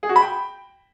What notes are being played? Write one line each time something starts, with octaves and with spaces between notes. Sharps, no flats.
G#4
F#4
B5
G5